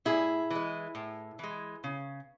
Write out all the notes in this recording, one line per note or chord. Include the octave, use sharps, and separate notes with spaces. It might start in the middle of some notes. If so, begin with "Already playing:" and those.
A2 E4 G#4
E3 G#3
A2
E3 G#3
C#3